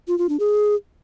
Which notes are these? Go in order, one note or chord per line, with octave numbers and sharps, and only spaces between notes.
F4
F4
D4
G#4